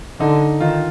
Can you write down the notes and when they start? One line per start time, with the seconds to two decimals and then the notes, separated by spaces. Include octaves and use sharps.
0.20 D3 D#4
0.60 D#3 F4